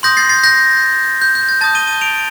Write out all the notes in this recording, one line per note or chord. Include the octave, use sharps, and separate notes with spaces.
C6 D#6 G6 A#6
A6 C7
A6 C7
G6 A#6
G6
G6
A6
A5 D#6 G6 A6
D#7 G7
D#7 G7
D7 F7